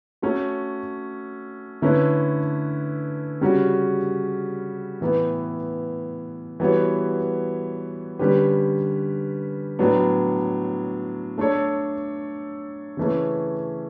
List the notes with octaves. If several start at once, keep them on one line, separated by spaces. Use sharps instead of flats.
A3 C#4 F#4
D3 A3 C#4 E4 B4
C#3 G3 C#4 F#4
A2 E3 B3
E3 G3 B3 F#4 C#5
D3 G3 C#4 G4 B4
A2 F#3 B3 D4
A3 D4 A4 C#5
C#3 E3 A3 C#4